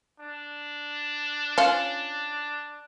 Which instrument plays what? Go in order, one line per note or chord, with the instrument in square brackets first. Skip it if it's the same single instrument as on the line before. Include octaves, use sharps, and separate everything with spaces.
[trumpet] D4
[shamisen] C#4 F4